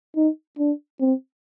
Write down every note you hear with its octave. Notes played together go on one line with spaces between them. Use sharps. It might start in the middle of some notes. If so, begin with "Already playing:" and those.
D#4
D4
C4